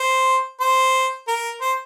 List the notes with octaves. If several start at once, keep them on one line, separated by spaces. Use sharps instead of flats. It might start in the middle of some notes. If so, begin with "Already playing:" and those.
Already playing: C5
C5
A#4
C5